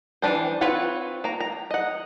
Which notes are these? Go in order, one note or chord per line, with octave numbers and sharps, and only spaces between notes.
E3 F#3 D4 C5
C4 F4 B4 C#5 F#5
A#3 A#5
A#5
D#5 F#5